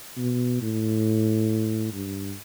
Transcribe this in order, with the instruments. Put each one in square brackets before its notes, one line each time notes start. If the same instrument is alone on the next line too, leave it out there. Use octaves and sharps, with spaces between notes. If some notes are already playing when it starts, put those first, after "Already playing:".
[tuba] B2
A2
G2